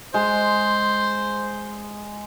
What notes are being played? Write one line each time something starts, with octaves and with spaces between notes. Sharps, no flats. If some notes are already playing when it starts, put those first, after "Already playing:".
G#3 C5